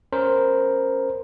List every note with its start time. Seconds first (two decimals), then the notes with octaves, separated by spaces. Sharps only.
0.13 C#4 A#4 C5